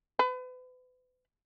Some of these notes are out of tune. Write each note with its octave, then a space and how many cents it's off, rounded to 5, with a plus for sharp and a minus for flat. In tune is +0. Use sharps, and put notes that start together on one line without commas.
B4 +35